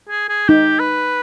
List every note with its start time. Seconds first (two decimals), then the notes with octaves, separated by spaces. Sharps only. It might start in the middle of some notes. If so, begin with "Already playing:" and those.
0.09 G#4
0.29 G#4
0.49 D#4 G4
0.79 B4